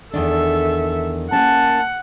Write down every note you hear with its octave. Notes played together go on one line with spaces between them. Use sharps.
E2 D#3 D4 A4 E5
A#3 C#4 F#5 A5